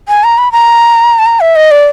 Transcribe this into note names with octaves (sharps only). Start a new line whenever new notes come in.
G#5
A#5
B5
A#5
A5
A#5
E5
D#5
D5